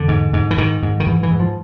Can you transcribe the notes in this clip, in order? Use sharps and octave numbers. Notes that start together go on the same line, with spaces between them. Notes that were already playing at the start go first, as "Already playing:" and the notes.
Already playing: E2 D3
G#2
G#2
E3
G#2 D#3
G#2
D#3
G#2 E3
E3
G#2
F3